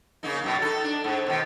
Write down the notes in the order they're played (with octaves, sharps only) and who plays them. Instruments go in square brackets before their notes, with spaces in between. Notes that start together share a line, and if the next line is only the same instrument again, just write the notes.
[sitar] C#3 A#3 D#4
F#2 B2
D#4 A4
D4
G#2
B2 D#3